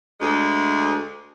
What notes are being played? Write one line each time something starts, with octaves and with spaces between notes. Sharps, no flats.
D2 G#3